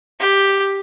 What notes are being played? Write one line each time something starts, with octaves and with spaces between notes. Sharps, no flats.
G4